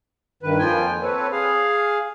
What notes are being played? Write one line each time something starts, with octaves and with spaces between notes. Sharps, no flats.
G2 D#3 B4
F2 F3 A#3 F4 G5 G#5
C4 A4 B4 C#5
G#4 F5